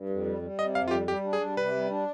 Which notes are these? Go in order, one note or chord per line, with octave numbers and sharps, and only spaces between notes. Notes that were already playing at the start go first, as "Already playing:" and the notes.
Already playing: G2
F2
G3
G3
C3 D#5
F2 F5
F4
G3 G4
G3 G4
D4
G#4
G3
C3 B4
G3
D4